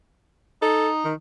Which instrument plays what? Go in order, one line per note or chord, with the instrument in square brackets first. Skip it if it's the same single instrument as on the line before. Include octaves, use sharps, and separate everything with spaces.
[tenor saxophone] D#4 [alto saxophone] A4
[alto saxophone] D#3